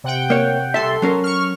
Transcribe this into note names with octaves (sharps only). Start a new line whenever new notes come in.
C3 F#5 G5
A#3 C#5
C2 A4 E5 C6
F#3 C#4 A#4
C#6 F6